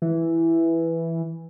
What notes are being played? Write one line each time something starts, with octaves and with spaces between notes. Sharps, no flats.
E3